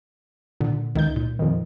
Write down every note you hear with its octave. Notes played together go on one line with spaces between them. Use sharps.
A#2 D3
C#2 D#3 D#4 G6
A#2
F2 D#3